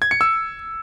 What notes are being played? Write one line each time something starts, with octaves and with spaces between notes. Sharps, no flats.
G#6
C#7
E6